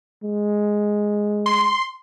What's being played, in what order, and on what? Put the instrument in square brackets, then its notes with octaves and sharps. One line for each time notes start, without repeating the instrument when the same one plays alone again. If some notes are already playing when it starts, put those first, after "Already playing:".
[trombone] G#3
[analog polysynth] C6